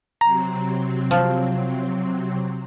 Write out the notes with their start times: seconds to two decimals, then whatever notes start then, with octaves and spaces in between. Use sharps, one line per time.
0.21 C3 F#3 C4 A#5
1.11 F3